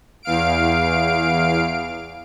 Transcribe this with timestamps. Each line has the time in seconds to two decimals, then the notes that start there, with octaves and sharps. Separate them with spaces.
0.23 E2 F5 D7